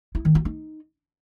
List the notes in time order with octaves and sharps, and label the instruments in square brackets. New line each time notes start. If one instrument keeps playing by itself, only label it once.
[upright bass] E4
D#3
F4
D#4